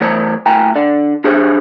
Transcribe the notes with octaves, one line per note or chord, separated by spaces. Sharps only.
E3 A3 C5 C#5
A2 G5 G#5 A#5
D3 D5
D4 G4 G#4 C5 C#5